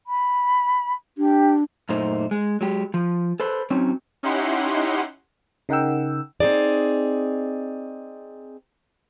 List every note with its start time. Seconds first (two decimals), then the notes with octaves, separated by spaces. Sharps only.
0.07 B5
1.18 D4 G4
1.89 F#2 A#2 A3 D#4 C5
2.31 G#3
2.61 F#3 G#3 G4
2.94 F3
3.40 A4 B4 C5
3.70 F#3 C4 C#4 D#4
4.23 C#4 D#4 E4 G4 F#5 C6
5.69 C#3 D#4 A#4 F#5 G5 E6
6.40 C4 D#4 G#4 D5